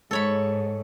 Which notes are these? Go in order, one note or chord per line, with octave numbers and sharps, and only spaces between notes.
G#2 A4 C#5 B5